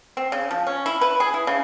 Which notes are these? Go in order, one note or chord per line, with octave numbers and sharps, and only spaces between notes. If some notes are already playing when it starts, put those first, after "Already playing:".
C4
C#3
F3
C#4
E4
B4
G#4
E4
C#3